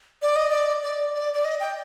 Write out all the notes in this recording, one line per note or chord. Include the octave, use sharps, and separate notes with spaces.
D5
D#5
D5
D5
D5
D5
D#5
G5